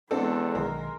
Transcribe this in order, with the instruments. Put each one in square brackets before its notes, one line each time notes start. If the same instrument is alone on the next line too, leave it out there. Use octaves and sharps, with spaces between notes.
[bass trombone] E2 [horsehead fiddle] G#3 B3 [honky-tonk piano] C4 D4 A4
[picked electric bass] B1 D#3 [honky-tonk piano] G#3 [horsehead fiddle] A#4